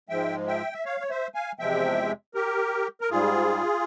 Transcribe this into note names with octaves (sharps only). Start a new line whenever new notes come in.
G#2 F3 G#3 E5 G5
E5 G5
E5
C#5 F5
C#5
C5 E5
F5 G#5
E2 C3 F3 G#3 E5 G5
G4 A#4
A#4
G#2 G3 F4 G#4